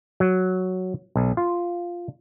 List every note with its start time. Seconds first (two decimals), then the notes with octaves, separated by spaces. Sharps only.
0.20 F#3
1.16 B1
1.37 F4